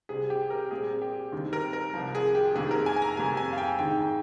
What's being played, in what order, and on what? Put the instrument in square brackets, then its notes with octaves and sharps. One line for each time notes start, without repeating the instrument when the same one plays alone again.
[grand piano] C2 C3 G3 C4 G#4
G4
A#4
A#2 G3 C4 G#4
G4
D#2 D#3 G3 C4
A#4
A#4
C2 C3 F3
G#4
G4
F2 C3 D#3 A#3 G#4
A#4
G#5
G#5
A#5
F2 C3 G3 A#3 G#5
G#5
F5
G5
G#2 D#3 G#3 G5